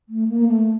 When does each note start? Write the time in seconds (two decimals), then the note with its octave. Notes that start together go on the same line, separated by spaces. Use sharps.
0.09 A3
0.28 A#3
0.48 A3